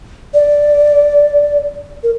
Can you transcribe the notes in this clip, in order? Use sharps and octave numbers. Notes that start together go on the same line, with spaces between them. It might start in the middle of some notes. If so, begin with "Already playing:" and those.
D5
A#4